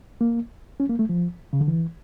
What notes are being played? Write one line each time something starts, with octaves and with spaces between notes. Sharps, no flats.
A#3
C#4
A#3
A3
F3
C#3
D3
E3